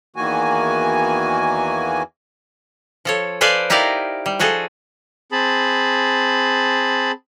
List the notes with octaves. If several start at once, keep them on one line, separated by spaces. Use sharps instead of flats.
E2 D#3 E3 A#3 F#4 G#5
F3 A4 C#5
A4 B4 C5 D5 F5 G#5
D#4 E4 G4 A#4 D5 F5
G3
F3 F#4 G#4 A4
C4 G#4 A5 B5